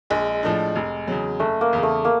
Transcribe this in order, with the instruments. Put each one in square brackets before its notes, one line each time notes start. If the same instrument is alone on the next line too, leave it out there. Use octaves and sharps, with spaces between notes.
[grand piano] A#1 [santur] G#3
[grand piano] A2 F3 A3 D4
F1
E2 C#3 F#3
[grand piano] F#1 [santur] A3
[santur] A#3
[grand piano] E2 C#3
[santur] A3
A#3